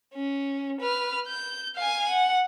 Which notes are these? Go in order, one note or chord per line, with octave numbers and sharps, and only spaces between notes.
C#4
B4 F6
G6
F5 G#5
F#5